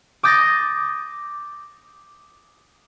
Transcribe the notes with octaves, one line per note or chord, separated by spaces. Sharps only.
D6 D#6 G6 A6 A#6